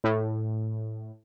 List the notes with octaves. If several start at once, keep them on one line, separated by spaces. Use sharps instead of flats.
A2